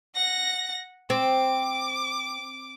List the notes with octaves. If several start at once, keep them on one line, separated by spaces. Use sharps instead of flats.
F#5 A#6
C4 D6